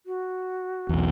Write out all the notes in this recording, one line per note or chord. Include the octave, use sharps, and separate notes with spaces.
F#4
B1 E2